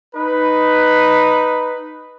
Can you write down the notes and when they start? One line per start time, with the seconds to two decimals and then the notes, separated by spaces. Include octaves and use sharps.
0.15 D#4 B4